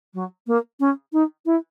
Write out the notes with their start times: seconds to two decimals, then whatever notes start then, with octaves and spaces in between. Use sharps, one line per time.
0.14 F#3
0.47 A#3
0.80 C#4
1.13 D#4
1.45 E4